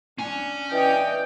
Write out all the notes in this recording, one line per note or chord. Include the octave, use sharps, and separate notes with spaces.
C#4 D4 G#5
E3 D5 D#5 G5